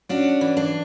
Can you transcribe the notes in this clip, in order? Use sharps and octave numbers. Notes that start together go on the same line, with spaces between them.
C#4 D4 F#4
E3
D4